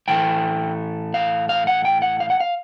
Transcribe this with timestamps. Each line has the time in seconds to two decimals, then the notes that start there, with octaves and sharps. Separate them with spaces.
0.08 A2 E3 A3 G5
1.14 F5
1.49 F5
1.67 F#5
1.85 G5
2.02 F#5
2.20 F5
2.30 F#5
2.40 F5